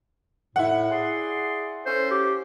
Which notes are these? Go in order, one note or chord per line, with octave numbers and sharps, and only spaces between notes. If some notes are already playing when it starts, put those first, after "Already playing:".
A2 E4 F#5
G#4 D5 C6
C#4 A4 C5
G4